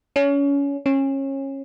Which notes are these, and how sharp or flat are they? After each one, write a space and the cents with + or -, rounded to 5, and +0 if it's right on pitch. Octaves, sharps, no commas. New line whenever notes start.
C#4 +25
C#4 -25